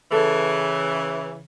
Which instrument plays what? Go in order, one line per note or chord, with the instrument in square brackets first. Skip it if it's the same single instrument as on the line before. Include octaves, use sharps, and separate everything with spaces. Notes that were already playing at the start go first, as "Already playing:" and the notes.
[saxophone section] C#3 E3 [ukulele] A4